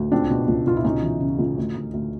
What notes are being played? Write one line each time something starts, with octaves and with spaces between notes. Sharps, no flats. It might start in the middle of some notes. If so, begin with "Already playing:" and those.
Already playing: D2
C#2 C4 D4
B2
C#2
B2 F4
E4
C#2 C#4 D#4
E3
C#3
C#2
D2
D2
D2